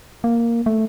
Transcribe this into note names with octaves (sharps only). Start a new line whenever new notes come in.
A#3
A3